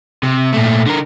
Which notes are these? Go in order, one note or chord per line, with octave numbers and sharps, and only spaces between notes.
C3
A#2 A3
D3 A#4